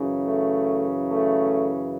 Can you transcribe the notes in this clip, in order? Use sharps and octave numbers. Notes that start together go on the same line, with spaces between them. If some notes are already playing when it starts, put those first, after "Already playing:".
Already playing: F#2 C#3 E3
A3
A3